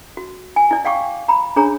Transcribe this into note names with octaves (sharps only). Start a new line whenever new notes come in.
F#4
G#5
E4 D5
D5 F5 G5 C#6 D6
A#5 B5
D4 G#4 C#5 A#5